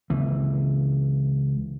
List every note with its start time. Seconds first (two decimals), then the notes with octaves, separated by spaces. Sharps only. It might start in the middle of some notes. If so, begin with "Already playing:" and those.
0.10 C#2 E3